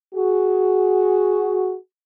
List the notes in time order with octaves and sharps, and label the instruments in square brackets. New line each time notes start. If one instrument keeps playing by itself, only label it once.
[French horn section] F#4 G#4